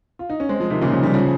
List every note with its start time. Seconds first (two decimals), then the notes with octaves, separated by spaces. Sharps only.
0.19 F4
0.30 D#4
0.40 C#4
0.49 G#3 C4
0.60 F3 G#3
0.70 C3 D#3
0.81 A#2 C#3
0.93 C#3 F3
1.03 D#3 G3
1.14 C#3 F3